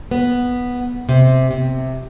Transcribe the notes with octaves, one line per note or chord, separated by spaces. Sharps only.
B3
C3
C3